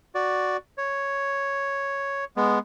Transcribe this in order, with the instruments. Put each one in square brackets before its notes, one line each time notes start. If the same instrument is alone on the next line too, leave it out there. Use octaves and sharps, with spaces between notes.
[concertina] F#4 D5
C#5
G#3 B3